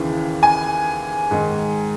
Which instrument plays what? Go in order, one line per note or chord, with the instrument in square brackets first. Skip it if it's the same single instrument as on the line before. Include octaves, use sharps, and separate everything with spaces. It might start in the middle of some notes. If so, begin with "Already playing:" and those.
Already playing: [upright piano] D#2 C#3 E3
G#5
G#2 D#3